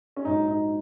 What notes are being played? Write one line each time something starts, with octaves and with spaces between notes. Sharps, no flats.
C#4
A#1 G#2 F#3 D#4
D#4